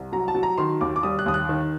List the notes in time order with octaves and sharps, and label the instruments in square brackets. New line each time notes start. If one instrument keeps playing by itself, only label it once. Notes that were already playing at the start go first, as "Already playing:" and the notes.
Already playing: [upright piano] C2
F#3 A#5
A5
F#3
A#5
D#3 C6
D#2 D6
D6
G3 D#6
F#6
D#2 D#6
F#6
D#3